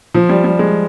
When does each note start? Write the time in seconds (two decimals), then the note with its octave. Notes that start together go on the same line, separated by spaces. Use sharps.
0.15 F3
0.29 G3
0.44 G3
0.59 G#3